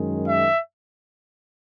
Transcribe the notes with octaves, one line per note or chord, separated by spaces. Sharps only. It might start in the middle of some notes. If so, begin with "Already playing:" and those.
Already playing: F#2 D#3 G#3
E5